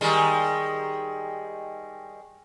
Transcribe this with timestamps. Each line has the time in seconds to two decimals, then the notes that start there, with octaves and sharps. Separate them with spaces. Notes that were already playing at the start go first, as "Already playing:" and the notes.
0.01 D#3 G3 G#3